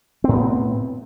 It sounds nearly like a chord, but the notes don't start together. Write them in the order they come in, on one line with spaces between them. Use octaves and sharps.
C4 A2 B3